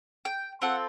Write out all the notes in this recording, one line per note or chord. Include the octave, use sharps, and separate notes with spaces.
G5
C4 F4 A4 F#5